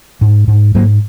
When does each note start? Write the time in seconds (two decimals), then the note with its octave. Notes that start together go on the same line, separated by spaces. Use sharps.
0.21 G#2
0.48 G#2
0.75 G#2 F#3 A#3